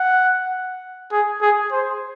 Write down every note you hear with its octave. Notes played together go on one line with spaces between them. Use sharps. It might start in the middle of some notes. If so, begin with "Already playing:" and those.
Already playing: F#5
G#4
G#4
C5